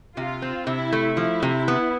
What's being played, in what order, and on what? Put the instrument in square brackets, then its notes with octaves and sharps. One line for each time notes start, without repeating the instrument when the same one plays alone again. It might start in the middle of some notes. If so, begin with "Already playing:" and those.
[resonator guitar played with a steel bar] C3 [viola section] F4
[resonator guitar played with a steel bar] C4
[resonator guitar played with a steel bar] C3 [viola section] E4
[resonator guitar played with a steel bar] A3
[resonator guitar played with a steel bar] F3 [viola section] E4
[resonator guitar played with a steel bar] C3
B3